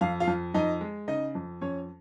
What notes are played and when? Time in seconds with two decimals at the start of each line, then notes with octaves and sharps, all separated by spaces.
0.01 F2 F5
0.20 F4 F5
0.27 F2
0.54 F2 D#4 D#5
0.81 G#3
1.08 C#3 D#4 D#5
1.35 F2
1.61 F2 C#4 C#5